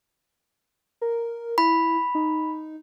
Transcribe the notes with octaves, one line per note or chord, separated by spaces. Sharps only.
A#4
E4 B5
D#4